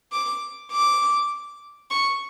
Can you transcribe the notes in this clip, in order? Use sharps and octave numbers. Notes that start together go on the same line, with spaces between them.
D6
D6
C#6